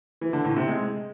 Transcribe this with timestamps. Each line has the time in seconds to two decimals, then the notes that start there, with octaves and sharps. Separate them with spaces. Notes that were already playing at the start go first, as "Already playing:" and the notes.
0.21 E3
0.33 D3
0.45 A2
0.56 C3
0.68 G#3